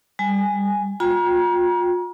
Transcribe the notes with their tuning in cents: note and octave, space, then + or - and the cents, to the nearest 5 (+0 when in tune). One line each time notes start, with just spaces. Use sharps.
G3 +15 G#5 +0
F4 +35 G5 -5 A#5 +40